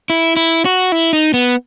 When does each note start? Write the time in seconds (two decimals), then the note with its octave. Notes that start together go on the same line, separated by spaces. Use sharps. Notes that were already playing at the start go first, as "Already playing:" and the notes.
0.10 E4
0.36 E4
0.65 F#4
0.92 E4
1.13 D#4
1.34 B3